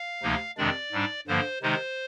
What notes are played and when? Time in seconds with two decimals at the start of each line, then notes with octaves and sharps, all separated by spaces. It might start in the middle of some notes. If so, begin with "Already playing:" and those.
Already playing: F5
0.23 D2 C3 F3 A#3 D#4
0.57 F2 C3 D#3 G#3 D4 D5
0.92 G#2 G3 D4
1.27 G2 D3 F3 A#3 C5
1.62 C3 D#3 G#3 D#4 C5